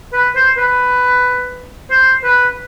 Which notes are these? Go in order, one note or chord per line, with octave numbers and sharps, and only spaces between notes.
B4
C5
B4
C5
B4